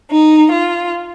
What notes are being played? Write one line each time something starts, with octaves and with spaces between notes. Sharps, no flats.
D#4
F4